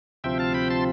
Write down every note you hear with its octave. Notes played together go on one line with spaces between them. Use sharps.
D2 C3 F3 C4 E5 G5
F5 A5
G5 B5
A5 C6